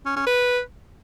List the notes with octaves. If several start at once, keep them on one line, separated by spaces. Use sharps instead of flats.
C#4
C#4
B4